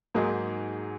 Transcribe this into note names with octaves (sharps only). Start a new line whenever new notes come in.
G#2 F#3 A#3 D#4 G#4